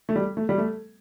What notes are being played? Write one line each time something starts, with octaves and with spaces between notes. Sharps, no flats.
A3
G3
A3
G3
A3